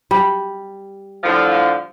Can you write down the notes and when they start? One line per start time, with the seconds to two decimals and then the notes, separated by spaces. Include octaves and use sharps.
0.11 G3
1.24 A2 D3 F3